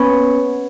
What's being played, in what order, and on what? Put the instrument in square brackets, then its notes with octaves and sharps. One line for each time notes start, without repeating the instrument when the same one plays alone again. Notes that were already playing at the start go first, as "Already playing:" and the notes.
Already playing: [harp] B3 C#4